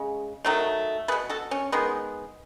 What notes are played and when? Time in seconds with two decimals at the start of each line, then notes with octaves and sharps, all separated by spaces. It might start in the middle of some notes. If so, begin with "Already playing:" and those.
Already playing: C#3 G#3
0.45 D#3 F#3 A3
1.08 A3 G#4 B4
1.12 B2
1.29 F#4 A4
1.51 C#4
1.72 D#3 G#3 B3